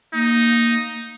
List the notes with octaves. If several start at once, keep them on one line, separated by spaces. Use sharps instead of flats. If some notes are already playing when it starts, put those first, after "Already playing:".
A#3 D#4